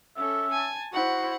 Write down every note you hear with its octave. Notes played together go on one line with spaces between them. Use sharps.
C#4 A4 E5
G#5 A5
E4 F#4 C5 F#5